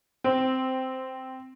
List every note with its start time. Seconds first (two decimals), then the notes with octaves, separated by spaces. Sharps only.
0.24 C4